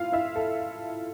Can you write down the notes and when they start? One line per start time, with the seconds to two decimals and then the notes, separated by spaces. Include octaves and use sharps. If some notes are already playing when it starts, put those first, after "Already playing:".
Already playing: G#1 E4 F4 F5
0.12 E4 E5
0.35 A4